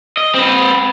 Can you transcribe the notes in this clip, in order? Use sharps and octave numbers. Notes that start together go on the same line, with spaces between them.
D#5
C4 B4